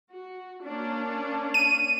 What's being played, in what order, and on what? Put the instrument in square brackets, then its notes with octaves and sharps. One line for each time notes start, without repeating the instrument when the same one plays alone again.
[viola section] F#4
A#3 C#4 D4
[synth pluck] D#7